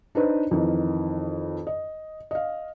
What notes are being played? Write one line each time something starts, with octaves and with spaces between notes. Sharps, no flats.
D4 D#4 B4 C5
F2 D#3 E3
D#5
D#5 F5